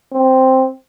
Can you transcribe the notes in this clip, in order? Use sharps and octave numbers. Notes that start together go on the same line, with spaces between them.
C4